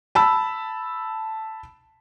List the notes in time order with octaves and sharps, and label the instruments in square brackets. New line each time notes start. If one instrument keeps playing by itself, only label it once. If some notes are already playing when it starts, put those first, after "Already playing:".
[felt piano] A5 B5 E6